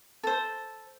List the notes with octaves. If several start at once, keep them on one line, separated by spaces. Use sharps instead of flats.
A4 C5